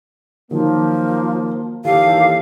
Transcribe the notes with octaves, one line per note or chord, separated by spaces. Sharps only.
D#3 F3 F#3 A#3
G1 D#2 E3 G4 A4 F5